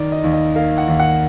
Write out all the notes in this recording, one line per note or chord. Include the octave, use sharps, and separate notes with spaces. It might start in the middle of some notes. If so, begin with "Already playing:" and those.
Already playing: D#3 D5
D#5
D#2
D#5
A#3 F5
F#5
D#2
F#5